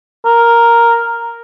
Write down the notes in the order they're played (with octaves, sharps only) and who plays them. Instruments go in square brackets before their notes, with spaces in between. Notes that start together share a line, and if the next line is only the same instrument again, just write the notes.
[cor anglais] A#4